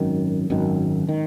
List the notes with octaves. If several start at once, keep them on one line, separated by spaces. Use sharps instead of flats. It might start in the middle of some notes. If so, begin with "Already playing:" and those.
Already playing: G#1 F#2 D#3
G#1 F#2 D#3
D#3